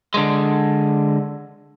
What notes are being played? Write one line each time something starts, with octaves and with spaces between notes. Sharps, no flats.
D3 G#3